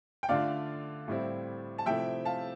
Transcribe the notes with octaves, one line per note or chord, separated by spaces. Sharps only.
G5
D3 A3 D4 F4 D5 F5
A2 G3 C4 E4
A5
C3 F3 A3 C4 E4 E5 G5
F5 A5